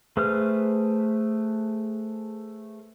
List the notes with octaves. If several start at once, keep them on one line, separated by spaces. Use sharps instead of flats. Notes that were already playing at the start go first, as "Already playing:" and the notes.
A3 G#4 B4 C5 F6